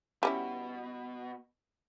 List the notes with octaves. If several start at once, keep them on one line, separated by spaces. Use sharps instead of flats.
B2 G3 C#4 E4